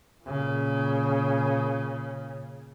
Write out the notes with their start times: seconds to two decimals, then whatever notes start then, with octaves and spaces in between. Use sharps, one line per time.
0.25 A#2 C#3